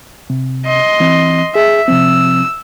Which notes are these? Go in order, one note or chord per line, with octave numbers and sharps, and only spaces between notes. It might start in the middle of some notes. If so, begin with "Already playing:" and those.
C3
D#5 C6
E3 C4
G#4 E5
C3 F3 C4 E6